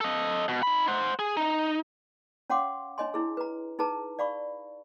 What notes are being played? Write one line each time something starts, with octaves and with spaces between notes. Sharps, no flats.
A4 D#5
B2
D#4 B5
C5 F#5
G#4
D#4
C#4 C#5 F5 F#5 C6 D6
D4 C#5 D#5 G#5 C6
D4 E4 G#4
B4 A#5
D#4 G#4 B4 A5 A#5
D5 F5 B5 C#6